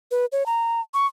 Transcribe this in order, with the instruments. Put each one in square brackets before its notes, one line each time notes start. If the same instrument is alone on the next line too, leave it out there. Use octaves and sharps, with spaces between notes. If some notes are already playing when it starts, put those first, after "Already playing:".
[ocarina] B4
C#5
A#5
C#6